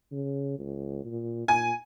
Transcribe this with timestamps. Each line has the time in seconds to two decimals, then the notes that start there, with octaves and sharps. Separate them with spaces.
0.12 C#3
0.59 C#2
1.05 A#2
1.48 A#2 G#5